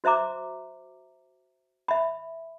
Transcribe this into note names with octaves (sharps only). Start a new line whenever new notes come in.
F#4 C5 E5 A#5 D6
E5 B5